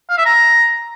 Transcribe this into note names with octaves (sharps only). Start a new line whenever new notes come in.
F5
E5
A#5